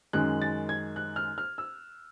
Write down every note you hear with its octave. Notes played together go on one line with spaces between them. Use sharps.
F#2 D#3 G#3 F#6
A6
G#6
F#6
F6
F6
E6